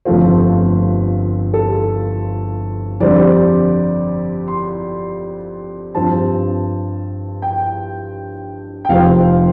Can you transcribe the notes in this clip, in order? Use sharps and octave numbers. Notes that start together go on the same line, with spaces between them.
G1 F2 F3 A3 C4 F4
A4
F2 D3 G3 C4 D5
C6
G2 F3 C4 A5
G5
G5
F1 F2 F3 C4 F5